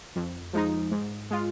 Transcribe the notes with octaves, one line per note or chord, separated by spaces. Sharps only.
F2
F3 G#3 D#4
G#2
G#3 F4